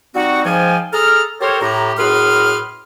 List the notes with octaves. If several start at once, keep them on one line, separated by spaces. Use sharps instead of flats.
G3 C4 D#4 F#4
G#2 F3 F5 G5 G#5
G#4 A4 A#5 F6
G4 A4 A#4 C5 C#5
A2 G4 A#5
F#2 A2 G#4 B4 C6 F6